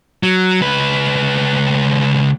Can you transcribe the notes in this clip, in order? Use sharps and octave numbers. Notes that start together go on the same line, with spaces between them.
F#3
C#2 B4